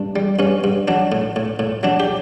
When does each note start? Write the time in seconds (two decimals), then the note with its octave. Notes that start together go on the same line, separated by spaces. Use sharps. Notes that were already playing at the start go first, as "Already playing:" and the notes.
Already playing: G2 D4
0.16 G3
0.39 G2 C#4
0.64 G2
0.88 F#3 D4
1.12 A2
1.36 A2
1.59 A2
1.83 F#3 D4
2.00 G4